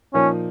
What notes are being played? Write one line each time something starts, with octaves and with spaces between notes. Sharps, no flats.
A#2 F3 A#3 C#4 D#4